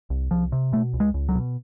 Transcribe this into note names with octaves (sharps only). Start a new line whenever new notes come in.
C2
C2 F3
C3
B2 A3
C#2
G#3
C#2
F#3
B2